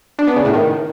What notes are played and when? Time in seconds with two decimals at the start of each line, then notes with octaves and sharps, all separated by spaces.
0.19 D4
0.27 B3
0.36 C#3
0.45 A2
0.53 D#3